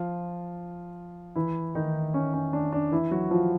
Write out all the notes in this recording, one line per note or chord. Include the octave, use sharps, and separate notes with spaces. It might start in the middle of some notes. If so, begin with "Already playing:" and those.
Already playing: F3 F4
E3 E4
D#3 D#4
C#4
C#4
D4
D4
E3 E4
F#3 F#4
F3 F4